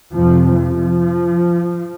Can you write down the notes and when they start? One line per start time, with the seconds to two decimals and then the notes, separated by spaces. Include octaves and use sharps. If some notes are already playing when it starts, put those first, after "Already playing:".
0.15 F2 C3 F3
0.57 F3